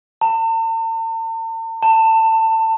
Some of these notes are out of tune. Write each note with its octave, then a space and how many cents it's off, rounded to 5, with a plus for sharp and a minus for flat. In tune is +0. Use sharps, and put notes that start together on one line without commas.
A5 +45
A5 +25